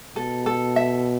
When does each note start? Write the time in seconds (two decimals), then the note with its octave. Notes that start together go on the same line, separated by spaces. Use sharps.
0.16 B2 A4
0.46 A4
0.76 E5